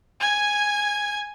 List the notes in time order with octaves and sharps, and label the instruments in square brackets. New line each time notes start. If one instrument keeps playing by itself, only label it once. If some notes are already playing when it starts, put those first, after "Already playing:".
[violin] G#5 G#6